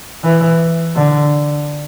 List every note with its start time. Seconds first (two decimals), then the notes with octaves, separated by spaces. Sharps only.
0.24 E3
0.96 D3